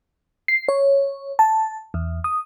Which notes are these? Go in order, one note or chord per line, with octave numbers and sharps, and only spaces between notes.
C7
C#5
A5
E2
D#6